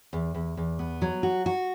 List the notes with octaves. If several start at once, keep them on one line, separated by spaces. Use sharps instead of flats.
E2
E2
E2
B3
F#3
F#4
F#4